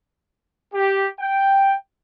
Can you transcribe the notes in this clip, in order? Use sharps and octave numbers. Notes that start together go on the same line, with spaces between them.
G4
G5